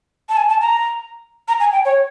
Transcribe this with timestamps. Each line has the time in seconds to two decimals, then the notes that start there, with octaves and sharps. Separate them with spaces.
0.29 A5
0.37 G#5
0.49 A5
0.61 A#5
1.48 A#5
1.60 G#5
1.72 G5
1.85 C#5